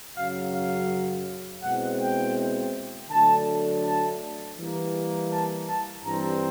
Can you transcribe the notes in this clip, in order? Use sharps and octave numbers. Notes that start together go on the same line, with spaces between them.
F#2 C#3 F#3 F5
F5
B2 G#3 C4 E4 F#5
G5
D3 F#3 A3 D4 A5
A5
E3 G3 A#3
A5
A5
G2 E3 G3 C4 A#5